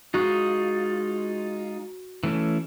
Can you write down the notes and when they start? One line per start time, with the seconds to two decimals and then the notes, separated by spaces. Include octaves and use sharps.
0.14 G#3 D#4 F4 F#4
2.24 E3 A3 C#4